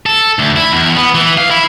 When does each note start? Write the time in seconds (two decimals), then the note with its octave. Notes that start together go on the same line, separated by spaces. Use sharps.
0.06 A4
0.39 D2
0.56 E4
0.72 E2
0.96 B3
1.15 E3
1.38 F5
1.51 E4